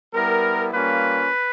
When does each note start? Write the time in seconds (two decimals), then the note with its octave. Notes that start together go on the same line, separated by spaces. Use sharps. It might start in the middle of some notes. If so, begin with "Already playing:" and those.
0.14 G3 B3 E4 A#4
0.72 G3 A#3 C#4 F4 B4